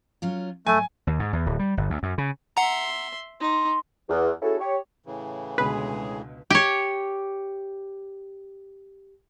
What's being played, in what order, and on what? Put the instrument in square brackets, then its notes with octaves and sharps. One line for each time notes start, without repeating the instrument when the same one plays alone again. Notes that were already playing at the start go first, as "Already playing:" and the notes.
[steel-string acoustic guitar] F#3 C#4 F4
[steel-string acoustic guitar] G#2 F#3 [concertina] A3 [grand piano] G#5
[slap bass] D#2
G#2
E2
D1
G3
G1
D2
F#2
C#3
[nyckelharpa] E5 C6 [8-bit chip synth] F#5 A#5
[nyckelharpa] D#4 [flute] C6
[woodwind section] E2
C#4 E4 F#4 G#4 A4
G4 C#5
[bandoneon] A2 C#3 E3
[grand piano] C#2 B2 D3 [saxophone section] G#3 G#4 [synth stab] B4
[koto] G4 C#5